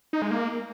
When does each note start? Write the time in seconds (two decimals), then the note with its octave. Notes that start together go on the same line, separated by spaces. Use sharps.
0.13 D#4
0.22 G#3
0.31 A#3